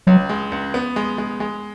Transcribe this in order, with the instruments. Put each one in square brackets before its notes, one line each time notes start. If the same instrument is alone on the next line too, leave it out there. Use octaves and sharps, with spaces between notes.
[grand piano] C#2 [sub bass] F#3
[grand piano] G#3
C#2
B3
G#3
G#3
G#3